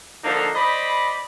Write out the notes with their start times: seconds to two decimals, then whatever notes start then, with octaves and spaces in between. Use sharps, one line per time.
0.24 D3 F3 A#3 D4 D#4 A4
0.55 C5 D5 D#5 B5